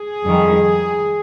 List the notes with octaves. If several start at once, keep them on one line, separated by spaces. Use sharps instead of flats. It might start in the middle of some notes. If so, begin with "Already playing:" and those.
Already playing: G#4
F2 D#3 G3